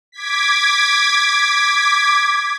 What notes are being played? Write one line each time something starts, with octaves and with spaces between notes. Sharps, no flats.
D6 G#6 B6